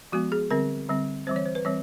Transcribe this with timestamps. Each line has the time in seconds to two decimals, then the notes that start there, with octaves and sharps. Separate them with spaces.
0.12 F3 G#3 B3 F#4
0.32 G#4
0.50 D3 G3 C4 A#4
0.89 D3 G3 C4
1.27 E3 G3 C4 C5
1.36 C#5
1.46 C5
1.55 B4
1.65 E3 G3 C4 C#5